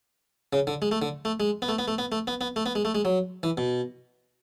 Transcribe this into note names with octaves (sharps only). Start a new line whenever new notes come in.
C#3
D3
G#3
A3
D3
A3
G#3
B3
A3
B3
A3
B3
A3
B3
B3
A3
B3
G#3
A3
G#3
F#3
E3
B2